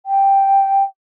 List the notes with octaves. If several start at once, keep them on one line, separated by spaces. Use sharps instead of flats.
G5